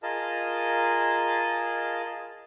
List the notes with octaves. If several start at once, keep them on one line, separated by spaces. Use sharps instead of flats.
F4 G#4 A#4 D#5 A5